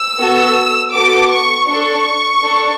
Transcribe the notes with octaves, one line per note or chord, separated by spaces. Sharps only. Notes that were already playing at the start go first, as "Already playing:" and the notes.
Already playing: E6
B3 F#4 A4
B3 F#4 A4 D6
C#6
D4 A4 C#6
D4 A4